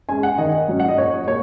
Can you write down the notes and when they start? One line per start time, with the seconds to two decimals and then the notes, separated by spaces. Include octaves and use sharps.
0.09 G#3 C#4 G#5
0.23 F#5
0.38 D#3 D#5
0.69 F#3 C#4
0.80 F#5
0.88 D#5
0.98 A#2 C#5
1.27 A#3 C#5